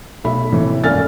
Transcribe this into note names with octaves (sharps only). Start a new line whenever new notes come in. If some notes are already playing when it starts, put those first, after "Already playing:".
B1 A3 E5 B5
A1 D#2 C3 E3
G#1 F#2 A4 G#5 F6 A6